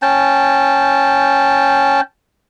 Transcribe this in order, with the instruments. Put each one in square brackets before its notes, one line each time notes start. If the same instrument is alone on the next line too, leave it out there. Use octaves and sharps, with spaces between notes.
[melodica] C#4 G5 A5